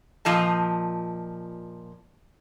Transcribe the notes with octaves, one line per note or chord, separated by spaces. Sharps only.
A#2 F3 D#5 A5